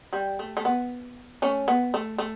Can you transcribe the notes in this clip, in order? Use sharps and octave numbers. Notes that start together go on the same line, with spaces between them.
G3
A3
A3
B3
A3 C#4
B3
A3
A3